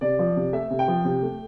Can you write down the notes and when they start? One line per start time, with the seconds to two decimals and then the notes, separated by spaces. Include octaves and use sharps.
0.01 C3 D5
0.19 F3
0.36 C3
0.53 A3 E5
0.70 C3
0.79 G5
0.88 F3
1.05 C3
1.22 A3